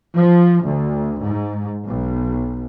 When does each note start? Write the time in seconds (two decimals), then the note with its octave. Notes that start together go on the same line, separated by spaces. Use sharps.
0.16 F3
0.65 D2
1.22 G#2
1.86 B1